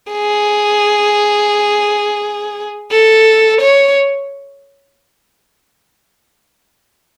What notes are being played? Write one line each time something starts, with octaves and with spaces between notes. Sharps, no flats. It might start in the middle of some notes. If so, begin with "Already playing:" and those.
G#4
A4
C#5